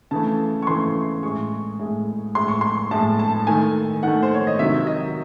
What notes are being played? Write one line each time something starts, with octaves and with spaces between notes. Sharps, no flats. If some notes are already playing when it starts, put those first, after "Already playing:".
C#3 E3 A3 A5
C#6
C#3 E3 A3 C6
A2 G#3 C#6
A2 G#3
A2 G#3 C6
C#6
C6
A2 G#3 A5
A5
D#3 A3 G#5
D#3 A3 F#5
C5
C#5
D#5
C3 D#3 F#3 E5
D#5